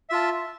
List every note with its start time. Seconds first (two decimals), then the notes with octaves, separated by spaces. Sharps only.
0.10 E5
0.12 F4
0.15 A5